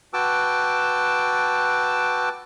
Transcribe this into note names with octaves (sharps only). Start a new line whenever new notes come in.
F#4 B4 G5 A5 D6 E6